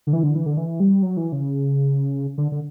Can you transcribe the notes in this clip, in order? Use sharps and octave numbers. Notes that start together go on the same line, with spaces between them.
D3
E3
D3
E3
D3
E3
G3
F#3
E3
C#3
D3
D3